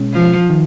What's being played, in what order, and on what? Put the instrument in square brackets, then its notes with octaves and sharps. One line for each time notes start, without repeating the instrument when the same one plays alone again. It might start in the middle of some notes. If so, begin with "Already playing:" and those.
Already playing: [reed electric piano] B2 G#3 C#4
[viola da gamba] F3
[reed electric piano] D#3